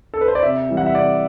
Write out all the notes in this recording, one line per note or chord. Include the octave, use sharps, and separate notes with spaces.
A4
B4
C5
D5
C3 E5
E3 G3
F#5
E5
C3 D5